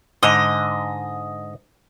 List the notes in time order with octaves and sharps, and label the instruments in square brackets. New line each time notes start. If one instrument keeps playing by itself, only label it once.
[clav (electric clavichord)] G#2 D3 [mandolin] D#5